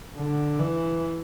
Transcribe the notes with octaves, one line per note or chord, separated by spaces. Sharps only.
D3
E3